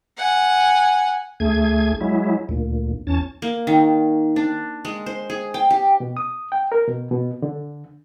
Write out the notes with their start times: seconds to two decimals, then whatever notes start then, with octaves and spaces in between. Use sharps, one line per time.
0.17 F#5 G#5
1.40 D2 A3 G#4 G#6
2.01 F#3 G#3 E4
2.49 D2 A#2
3.07 E2 C#4 A5
3.42 A#3
3.67 D#3
4.36 D4
4.85 G#3
5.06 C5
5.30 G#4
5.54 G5
5.71 G4
6.00 B2
6.17 D#6
6.52 G5
6.72 A#4
6.88 B2
7.11 B2
7.42 D3